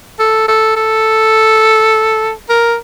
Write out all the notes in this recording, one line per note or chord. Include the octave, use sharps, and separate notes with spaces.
A4
A4
A4
A#4